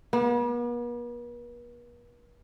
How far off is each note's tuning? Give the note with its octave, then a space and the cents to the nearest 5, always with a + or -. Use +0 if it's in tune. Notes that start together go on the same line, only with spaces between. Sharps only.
B3 -45